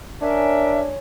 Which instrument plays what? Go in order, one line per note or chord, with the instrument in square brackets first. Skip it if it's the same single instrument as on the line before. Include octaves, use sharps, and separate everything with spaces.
[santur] C#4 C#5 G#5 [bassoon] D4 [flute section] A#4 E5